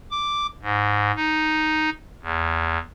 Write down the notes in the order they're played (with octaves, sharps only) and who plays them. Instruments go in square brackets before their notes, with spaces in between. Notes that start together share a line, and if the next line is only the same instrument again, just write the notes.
[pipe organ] D6
G#2
D#4
E2